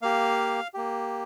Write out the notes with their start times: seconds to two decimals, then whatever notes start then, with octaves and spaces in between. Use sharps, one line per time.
0.02 A#3 G4 F5
0.74 A#3 G4